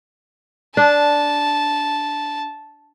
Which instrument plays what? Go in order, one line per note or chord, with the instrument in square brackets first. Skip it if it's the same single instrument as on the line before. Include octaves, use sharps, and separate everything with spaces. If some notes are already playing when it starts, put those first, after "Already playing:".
[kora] D4 [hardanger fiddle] A5